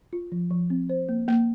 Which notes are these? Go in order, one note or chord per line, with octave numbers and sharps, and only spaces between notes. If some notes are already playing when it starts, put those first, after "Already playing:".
F4
F3
F3
C4
C5
A#3
A#3